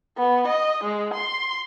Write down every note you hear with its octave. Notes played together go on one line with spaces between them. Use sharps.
B3
D#5
G#3
C6